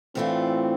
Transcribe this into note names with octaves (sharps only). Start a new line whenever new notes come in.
A2 E3 A3 C4 D4 F4